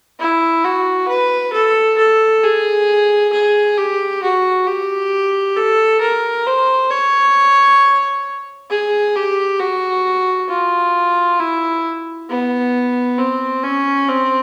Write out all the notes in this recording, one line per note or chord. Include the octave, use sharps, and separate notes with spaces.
E4
F#4
B4
A4
A4
G#4
G#4
G4
F#4
G4
A4
A#4
C5
C#5
G#4
G4
F#4
F4
E4
B3
C4
C#4
C4